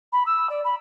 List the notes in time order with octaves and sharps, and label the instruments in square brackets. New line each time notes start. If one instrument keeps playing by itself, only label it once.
[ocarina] B5
E6
D5
B5